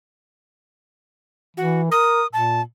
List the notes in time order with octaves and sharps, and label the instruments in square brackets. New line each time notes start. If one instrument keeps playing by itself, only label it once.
[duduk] E3 [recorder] F#4
[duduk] A#4 [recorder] D#6
[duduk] A#2 [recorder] A5